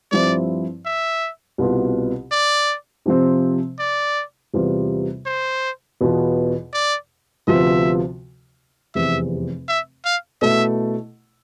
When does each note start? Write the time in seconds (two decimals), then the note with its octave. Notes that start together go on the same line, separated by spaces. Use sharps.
0.12 G2 F3 C4 E4 D5
0.86 E5
1.58 C2 B2 B3 F4 B4
2.32 D5
3.06 C3 F3 C4
3.79 D5
4.54 E2 C3 G3 B3 F4
5.26 C5
6.01 E2 B2 B3 F4
6.74 D5
7.47 D2 C3 F3 B3 F4 E5
8.95 F1 E2 C3 E5
9.68 E5
10.05 F5
10.42 B2 A3 E4 E5